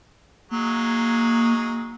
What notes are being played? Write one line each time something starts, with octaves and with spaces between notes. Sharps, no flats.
F#3 G#3 A#3 D#4